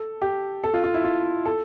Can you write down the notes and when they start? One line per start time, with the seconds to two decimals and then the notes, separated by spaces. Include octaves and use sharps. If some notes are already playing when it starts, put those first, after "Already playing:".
Already playing: A4
0.22 G4
0.64 A4
0.74 F4
0.84 F4
0.94 E4
1.04 F4
1.45 A4